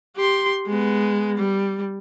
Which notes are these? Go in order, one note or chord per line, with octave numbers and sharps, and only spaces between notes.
G4 C6
G#3 B3
G3